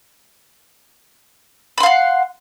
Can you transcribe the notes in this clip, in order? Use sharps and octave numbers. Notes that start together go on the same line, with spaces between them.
F5 F#5 B5 C6